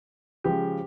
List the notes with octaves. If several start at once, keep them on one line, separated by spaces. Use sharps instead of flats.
C#3 F3 G#3 G4